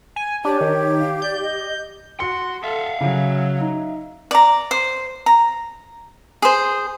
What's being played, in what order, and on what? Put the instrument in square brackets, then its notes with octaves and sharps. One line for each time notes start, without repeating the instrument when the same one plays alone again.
[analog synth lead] G#5
[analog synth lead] D4 [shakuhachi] G4 [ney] C#5
[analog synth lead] D#3
[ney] F5
[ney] D5 [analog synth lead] G6
[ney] D#5
[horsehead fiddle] F#4 [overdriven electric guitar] C6 [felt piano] C#7
[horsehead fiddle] A4 [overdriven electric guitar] E5 F5
[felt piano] C#3 [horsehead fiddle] F#3
[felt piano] D#4
[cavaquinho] D5 A#5
C5
A#5
G#4 C5